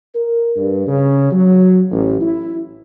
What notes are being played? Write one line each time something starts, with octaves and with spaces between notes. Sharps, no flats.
A#4
G2
C#3
F#3
A1
E4